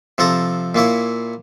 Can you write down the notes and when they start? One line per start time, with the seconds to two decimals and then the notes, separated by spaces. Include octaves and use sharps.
0.18 C3 F3 A4 A#5
0.75 A#2 A#3 E4 C#5